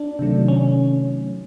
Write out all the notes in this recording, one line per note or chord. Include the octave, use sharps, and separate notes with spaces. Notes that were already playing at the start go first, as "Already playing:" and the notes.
Already playing: D4
C3 D#3 F#3 A3
C#4